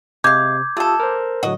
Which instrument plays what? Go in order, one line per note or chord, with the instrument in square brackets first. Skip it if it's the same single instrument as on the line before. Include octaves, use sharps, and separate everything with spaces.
[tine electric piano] C3 [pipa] G#3 F5 [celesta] D6 G6 G#6
[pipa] A3 A4 [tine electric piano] F4 G4 D#6
[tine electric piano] A#4 C5
[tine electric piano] A2 D3 F#3 [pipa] F#4 D#5